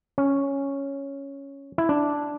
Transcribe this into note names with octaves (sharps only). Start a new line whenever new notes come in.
C#4
E4
D4